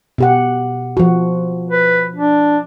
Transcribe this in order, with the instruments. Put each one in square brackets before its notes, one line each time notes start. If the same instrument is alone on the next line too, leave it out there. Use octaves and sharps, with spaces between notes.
[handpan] B2 G4 F#5
F3 F#4
[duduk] B4
D4